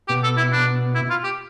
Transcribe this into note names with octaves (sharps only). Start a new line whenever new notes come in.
B2 G4
A4
E4
D4
E4
F4
G4